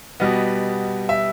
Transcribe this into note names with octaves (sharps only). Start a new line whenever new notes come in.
B2 G3 B3 D#5
E5